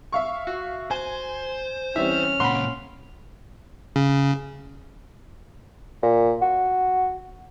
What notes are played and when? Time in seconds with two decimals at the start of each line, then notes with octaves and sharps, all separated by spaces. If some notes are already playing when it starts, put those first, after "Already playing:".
0.12 E5 F5 C#6
0.47 F#4
0.91 C5 G#5
1.96 E3 G3 C4 C#4 E5 F6
2.40 C#2 A#2 F#5 B5 C6
3.96 C#3
6.03 A#2
6.42 F#4